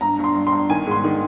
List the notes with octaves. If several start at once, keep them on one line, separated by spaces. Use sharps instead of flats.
G2 A#5
G2
C6
G2
C6
G2
D#3 G#5
G#2
C6
D#3